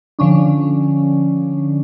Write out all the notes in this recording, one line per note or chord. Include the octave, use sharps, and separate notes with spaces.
D3 F3 C#4 D4